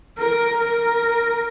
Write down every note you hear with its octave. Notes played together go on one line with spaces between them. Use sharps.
A#4
A#4